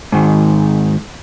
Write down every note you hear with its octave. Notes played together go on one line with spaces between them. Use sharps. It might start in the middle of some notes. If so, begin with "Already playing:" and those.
G#2 D#3